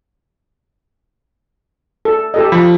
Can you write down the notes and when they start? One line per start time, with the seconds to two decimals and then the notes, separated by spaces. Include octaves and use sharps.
2.05 A4
2.34 G4 A4 D#5
2.52 F3 B5